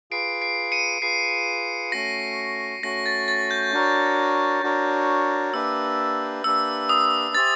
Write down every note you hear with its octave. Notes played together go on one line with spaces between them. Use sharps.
F4 G#4 B4 C7 D7
C7 D7
C#7 D#7
F4 G#4 B4 C7
A3 C#4 F#4 A#6
A3 C#4 F#4 A#6
A6
A6
G6
D4 F#4 A#4 C#5
D4 F#4 A#4 C#5
A#3 D4 G4 B4 E5 E6
A#3 D4 G4 B4 E5 E6
D#6
G4 C5 E5 G#5 A6